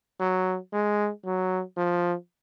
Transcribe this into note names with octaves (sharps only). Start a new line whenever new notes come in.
F#3
G#3
F#3
F3